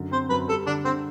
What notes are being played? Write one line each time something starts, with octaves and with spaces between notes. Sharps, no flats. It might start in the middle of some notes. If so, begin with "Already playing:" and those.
Already playing: F#2 D3
C4 C5
F#2 B4
G3 A4
D3 D4
D3 C4